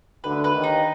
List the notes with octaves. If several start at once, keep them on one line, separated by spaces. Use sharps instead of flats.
D2 D3 B4
B4
D#2 D#3
D#4